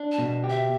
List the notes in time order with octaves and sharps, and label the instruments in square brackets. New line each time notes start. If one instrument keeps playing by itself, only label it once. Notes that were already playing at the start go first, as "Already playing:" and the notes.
Already playing: [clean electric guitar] D4
[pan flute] A5
[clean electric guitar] B2
G4
[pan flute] E5